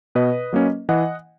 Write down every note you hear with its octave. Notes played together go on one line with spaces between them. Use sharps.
B2 B4 D#5
F#3 A#3 C#4
E3 D#5 F#5